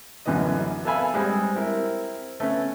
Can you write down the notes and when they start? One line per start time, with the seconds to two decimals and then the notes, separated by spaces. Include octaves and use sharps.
0.26 A1 F#2 D3 E3 B3 D#5
0.84 B3 A4 E5 F5 G#5 B5
1.14 G3 G#3 C4
1.55 C4 E4 A#4
2.40 A3 B3 C#4